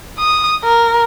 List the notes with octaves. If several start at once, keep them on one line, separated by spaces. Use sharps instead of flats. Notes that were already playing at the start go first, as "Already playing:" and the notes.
D#6
A#4